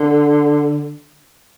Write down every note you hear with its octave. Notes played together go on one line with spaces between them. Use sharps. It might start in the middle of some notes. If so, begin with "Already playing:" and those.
Already playing: D3